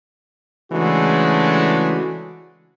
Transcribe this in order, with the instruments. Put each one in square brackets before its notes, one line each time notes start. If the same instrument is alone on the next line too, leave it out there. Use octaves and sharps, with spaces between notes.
[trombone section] C#3 E3 G#3 A3 D4 F#4